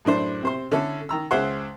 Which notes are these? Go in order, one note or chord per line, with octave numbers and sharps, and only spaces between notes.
F#2 A2 D4 C5
C3 C5 C6
D3 C#4 E4 A4
D#3 A#5 E6
C#2 G#4 C5 E5 F#5 C6